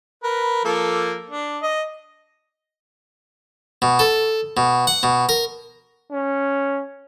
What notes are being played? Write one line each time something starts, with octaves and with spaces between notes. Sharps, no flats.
A#4 B4
F3 A#3 A4
D4
D#5
B2
A4
B2
F#5
B2
A#4
C#4